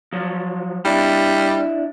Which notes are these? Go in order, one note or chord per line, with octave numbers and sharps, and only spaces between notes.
F3 F#3
G3 D4 E4